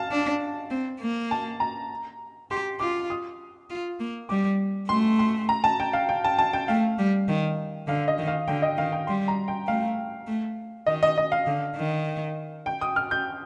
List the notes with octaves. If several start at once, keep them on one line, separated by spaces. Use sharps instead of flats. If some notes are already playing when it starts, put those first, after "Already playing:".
Already playing: F5 A5
D4
C4
A#3
A5
A#5
G4 C6
F4 D6
D#6
F4
A#3
G3 D6
A3 C6
C6
A#5
A5
G5
F5
G5
A5
A5
G5
A3 F5
G3
D#3
D3 F5
D#5
D#3
F5
D3 G5
D#5
D#3 F5
G5
G3 C6
A#5
G5
A3 F5
A3
D#3 D#5
D#5
D#5
F5
D3
D#3
G5
D#6
F6
G6